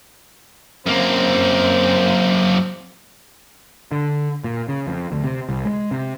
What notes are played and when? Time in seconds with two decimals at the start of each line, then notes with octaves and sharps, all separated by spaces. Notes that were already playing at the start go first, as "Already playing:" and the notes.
0.87 F#2 A#3 C4
3.92 D3
4.44 A#2
4.68 C#3
4.87 F2
5.12 D2
5.24 C3
5.49 C2
5.65 G#3
5.91 C3